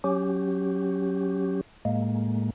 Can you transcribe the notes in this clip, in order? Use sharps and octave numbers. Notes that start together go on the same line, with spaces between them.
F#3 C#4 G4
A2 G#3 A#3